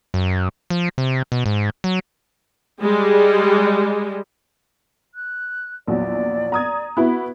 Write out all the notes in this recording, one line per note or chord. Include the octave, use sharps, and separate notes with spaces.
F#2
F3
C3
B2
G#2
F#3
G3 G#3
F#6
A#1 E2 F#3 D5
A#5 D#6 G#6
B3 E4 F#4